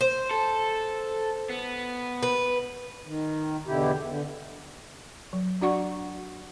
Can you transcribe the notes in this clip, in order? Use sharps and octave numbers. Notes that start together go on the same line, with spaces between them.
C5
A4
B3
B4
D#3
E2 B2 D3 E4 G4
D3
F#3
D4 F#4 D5 F#5 C#6